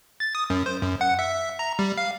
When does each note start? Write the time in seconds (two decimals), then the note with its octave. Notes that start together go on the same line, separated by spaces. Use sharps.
0.20 A6
0.35 D#6
0.50 F#2
0.66 C5
0.82 F#2
1.01 F#5
1.19 E5
1.59 A#5
1.79 G3
1.97 F5